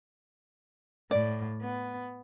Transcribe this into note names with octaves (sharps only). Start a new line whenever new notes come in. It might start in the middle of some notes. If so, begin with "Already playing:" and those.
A2 D5
B3